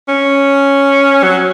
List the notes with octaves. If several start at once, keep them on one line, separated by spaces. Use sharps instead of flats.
C#4
F#3